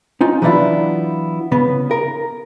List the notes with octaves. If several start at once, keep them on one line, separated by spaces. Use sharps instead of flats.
C#4 D#4 F4
E3 F#3 B3 D4 E4 F4
C#3 B3
A#4